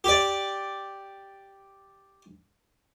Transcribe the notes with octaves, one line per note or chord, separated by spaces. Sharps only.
G4 D5